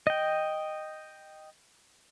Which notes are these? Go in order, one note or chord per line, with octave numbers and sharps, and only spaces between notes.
D#5 G5